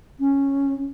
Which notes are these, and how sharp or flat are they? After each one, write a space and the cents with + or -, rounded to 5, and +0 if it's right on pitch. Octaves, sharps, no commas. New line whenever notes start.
C#4 -5